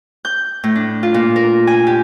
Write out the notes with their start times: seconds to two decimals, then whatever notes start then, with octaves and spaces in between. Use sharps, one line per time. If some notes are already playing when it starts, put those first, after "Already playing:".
0.25 G6
0.64 A2
0.76 D4
1.03 F4
1.14 A#2
1.36 A#4
1.67 G#5
1.87 G4